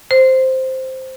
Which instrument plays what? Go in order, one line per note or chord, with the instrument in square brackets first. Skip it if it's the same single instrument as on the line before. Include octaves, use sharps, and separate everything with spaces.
[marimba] C5